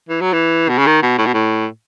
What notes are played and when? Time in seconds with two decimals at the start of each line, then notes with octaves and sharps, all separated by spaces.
0.09 E3
0.21 F#3
0.33 E3
0.69 B2
0.78 C#3
0.87 D#3
1.03 B2
1.18 A2
1.26 B2
1.34 A2